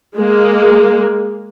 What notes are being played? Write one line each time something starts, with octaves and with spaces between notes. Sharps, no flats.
G#3 A#3